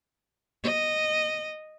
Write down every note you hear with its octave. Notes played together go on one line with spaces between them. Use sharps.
D#5